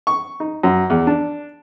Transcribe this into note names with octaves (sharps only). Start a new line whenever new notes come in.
C#6
D#4
F#2
E2
D4